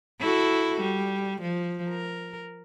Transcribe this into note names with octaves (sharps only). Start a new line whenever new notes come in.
E4 F#4 A4
G3
F3
A#4